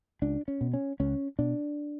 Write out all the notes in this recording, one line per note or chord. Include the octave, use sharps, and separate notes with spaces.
C#2 D4
C#4
B2
C#4
C#2 C#4
B2 D4